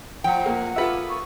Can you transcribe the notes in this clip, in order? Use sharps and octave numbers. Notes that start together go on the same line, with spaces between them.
A2 F3 F#5 G5
A#3
A#3 B3 F4 A4 B4 E5
C#6